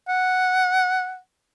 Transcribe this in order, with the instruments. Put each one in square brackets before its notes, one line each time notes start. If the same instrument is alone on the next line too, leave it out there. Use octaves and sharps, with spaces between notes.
[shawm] F#5